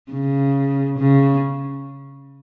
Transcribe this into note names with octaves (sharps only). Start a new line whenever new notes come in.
C#3
C#3